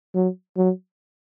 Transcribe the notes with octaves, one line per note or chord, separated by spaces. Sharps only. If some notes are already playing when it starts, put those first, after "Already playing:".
F#3
F#3